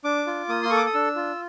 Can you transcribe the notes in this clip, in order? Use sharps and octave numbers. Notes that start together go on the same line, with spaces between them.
D4 D6
F4
A#3 D#6
C6
A4 C#6
D6
D#6
D4 E6
F4